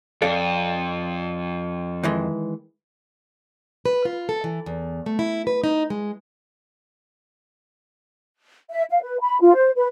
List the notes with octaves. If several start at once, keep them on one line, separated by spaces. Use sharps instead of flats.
F2 A4 D5 F5
D#3 E3 G#3
B4
F4
A4
E3
E2
A3
E4
B4
D#4
G#3
E5
F5
B4
B5
F4
C5
B4